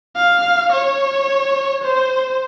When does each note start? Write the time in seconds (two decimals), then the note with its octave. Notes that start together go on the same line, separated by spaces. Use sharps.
0.16 F5
0.72 C#5
1.84 C5